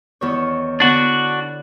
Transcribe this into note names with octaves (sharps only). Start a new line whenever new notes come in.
E2 D#3 C#5
D3 B3 D4 F#4 F#5